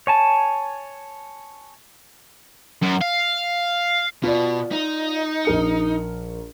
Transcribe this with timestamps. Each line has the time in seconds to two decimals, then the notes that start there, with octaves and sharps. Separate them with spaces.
0.07 C#5 G#5 A5
2.83 F#2
3.01 F5
4.23 B2 F4 D5
4.72 D#4
5.45 A#1 A#4 C#7